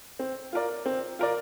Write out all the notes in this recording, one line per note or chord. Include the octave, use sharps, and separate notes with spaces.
C4
F4 A#4 D5
C4
F4 A#4 D5